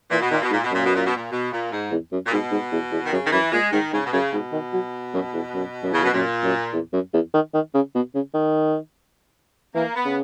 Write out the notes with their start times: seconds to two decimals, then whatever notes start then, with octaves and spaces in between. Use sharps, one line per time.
0.11 A#2 E3
0.21 B2
0.31 A#2 D#3
0.42 B2
0.50 G#2
0.53 A#2
0.64 B2
0.71 F#2 A#2
0.85 B2
0.95 A#2
1.06 B2
1.16 A#2
1.31 B2
1.51 A#2
1.71 G#2
1.91 E2
2.12 F#2
2.26 A#2
2.31 G#2 B2
2.51 G#2
2.72 E2
2.92 E2
3.05 D#3
3.12 F#2 C#3
3.25 D#3
3.32 F#2 E3
3.52 A#2 G#3
3.72 G#2 D#3
3.93 G#2 C#3
4.06 B2
4.13 F#2 C#3
4.32 G#2 B2
4.52 D#3
4.73 F#3
5.14 F#2
5.34 E2
5.54 F#2
5.83 F#2
5.92 E2 C#3
6.03 F#2 B2
6.13 F#2 A#2
6.43 F#2
6.73 E2
6.93 F#2
7.13 E2
7.34 D#3
7.54 D#3
7.74 C#3
7.95 B2
8.14 C#3
8.34 D#3
9.74 E3 A#3
9.95 B3
10.05 C#3